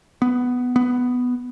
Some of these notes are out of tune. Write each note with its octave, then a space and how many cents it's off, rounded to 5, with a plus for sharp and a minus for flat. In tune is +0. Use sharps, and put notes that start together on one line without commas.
B3 +5
B3 +5